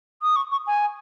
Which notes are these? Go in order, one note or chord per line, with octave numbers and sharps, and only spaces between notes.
D#6
C#6
C#6
G#5